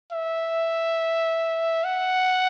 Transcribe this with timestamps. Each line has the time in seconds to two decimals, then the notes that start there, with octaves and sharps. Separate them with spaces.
0.12 E5
1.84 F#5